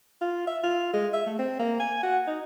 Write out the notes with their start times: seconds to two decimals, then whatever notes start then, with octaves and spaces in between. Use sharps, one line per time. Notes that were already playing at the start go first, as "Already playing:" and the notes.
0.21 F4
0.47 E5
0.63 F4
0.93 G#3
1.13 E5
1.26 A3
1.39 C4
1.59 A#3
1.80 G#5
2.03 F#4
2.27 D#4